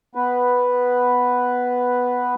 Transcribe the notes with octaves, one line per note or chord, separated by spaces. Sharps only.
B3 B4